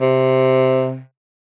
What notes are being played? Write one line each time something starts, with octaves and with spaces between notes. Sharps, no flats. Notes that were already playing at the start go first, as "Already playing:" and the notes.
C3